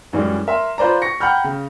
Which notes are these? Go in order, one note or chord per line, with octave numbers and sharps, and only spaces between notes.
F#2 E3 G3 G#3
A#4 E5 C6
F4 B4 C5 D5 A#5
C#6 A#6 C#7
F#5 G5 A#5 B5 F6 G6
C#3